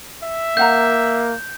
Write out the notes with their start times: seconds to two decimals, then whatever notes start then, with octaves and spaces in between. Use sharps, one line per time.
0.23 E5
0.57 A#3 F5 F#5 A#5 G6